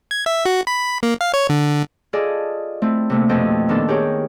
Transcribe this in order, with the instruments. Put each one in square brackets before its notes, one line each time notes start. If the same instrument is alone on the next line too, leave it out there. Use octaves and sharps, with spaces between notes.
[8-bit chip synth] G#6
E5
F#4
B5
A#3
F5
C#5
D3
[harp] F4 G#4 A4 D5 D#5
A3 C4 E4
C3 A3 A#3
F2 B2 D4 A4 D#5 G5
A#2 D#3 B3 D4 A4
B3 G4 G#4 A#4 C#5 G5